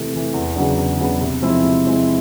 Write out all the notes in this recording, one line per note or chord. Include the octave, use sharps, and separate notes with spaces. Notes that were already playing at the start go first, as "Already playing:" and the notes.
Already playing: C3 E3 A3
E3 A3
E2
C#3 F#3 B3 D4
E2
C#3 F#3 B3 D4
C3
F3 G#3 C4 E4
C3
F3 G#3 C4 E4